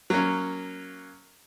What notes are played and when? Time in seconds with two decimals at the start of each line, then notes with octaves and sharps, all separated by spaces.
0.10 F#3 A#3 C#4